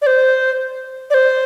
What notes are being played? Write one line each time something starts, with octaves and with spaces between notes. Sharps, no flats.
D5
C5
D5
C5